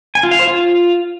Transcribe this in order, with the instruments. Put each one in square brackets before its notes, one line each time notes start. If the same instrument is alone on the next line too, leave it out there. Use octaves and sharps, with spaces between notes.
[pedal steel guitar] G#5
F4
F5
C5
F4